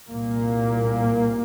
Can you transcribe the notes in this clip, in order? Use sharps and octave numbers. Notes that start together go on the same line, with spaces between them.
C2 A#2 A#3